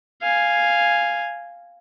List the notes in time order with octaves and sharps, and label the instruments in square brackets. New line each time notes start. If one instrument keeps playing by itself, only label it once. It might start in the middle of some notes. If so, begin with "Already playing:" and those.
[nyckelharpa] F5 G#5